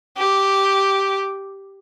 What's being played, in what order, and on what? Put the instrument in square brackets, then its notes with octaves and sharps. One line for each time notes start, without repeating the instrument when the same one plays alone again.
[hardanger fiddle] G4